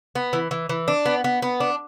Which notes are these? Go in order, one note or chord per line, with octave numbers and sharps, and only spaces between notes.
B3
E3
E3
E3
D4
B3
B3
B3
D4